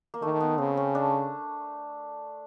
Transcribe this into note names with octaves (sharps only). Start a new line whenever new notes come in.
A#3
D#3 A3
B3
C#3 C4
C#4
D4